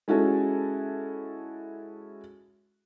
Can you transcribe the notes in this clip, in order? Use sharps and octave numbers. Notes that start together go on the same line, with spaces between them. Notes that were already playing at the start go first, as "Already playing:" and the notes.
G#3 C#4 E4 F#4 A4